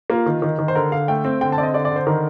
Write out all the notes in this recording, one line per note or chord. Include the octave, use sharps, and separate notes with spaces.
A#3 F4
D#3
D#3
D#3
C5
D3 A#4
D3 F5
A3 G5
C4
D3 G5
A5
C4 D5
D#5
D3 D5
D5
D3
C5
D#3 A#4